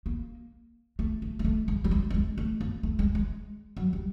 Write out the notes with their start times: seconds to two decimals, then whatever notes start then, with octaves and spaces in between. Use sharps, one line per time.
0.06 A#3
0.99 A3
1.22 A3
1.39 G#3
1.45 A3
1.68 G#3
1.84 G3
1.91 G#3
2.10 A3
2.14 G#3
2.38 A3
2.61 A#3
2.83 A3
2.99 G#3
3.15 G#3
3.77 F#3
3.93 G3